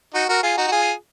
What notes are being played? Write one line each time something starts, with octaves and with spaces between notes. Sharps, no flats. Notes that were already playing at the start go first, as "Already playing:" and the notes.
D#4 F#4
F#4 A#4
F4 G#4
D#4 F#4
F#4
F4 G#4